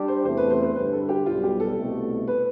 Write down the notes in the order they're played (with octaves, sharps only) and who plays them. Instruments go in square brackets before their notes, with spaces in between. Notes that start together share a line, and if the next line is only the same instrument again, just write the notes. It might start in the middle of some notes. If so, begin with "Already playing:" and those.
Already playing: [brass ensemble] G3 D4 G4
[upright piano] C5
[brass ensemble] E2 C3 E3 A3 [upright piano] C5
[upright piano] B4
C5
C5
[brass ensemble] G2 D3 G3 [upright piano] B4
[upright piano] A4
G4
[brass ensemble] B1 B2 G3 [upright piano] F4
[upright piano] G4
A4
[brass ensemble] C2 B2 A3
[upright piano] B4